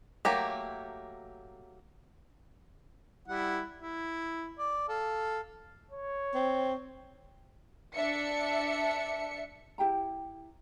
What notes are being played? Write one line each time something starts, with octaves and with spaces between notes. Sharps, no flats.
F#3 A3 A#3 G4
G3 E4 F#5
E4
D5
A4 F5
C#5
C4
D4 E5 C#7
E4 G4 G5 A#5